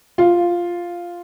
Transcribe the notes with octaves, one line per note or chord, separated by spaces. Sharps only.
F4